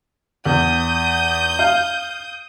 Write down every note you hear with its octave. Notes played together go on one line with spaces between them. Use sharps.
E2 D#6 G6
F5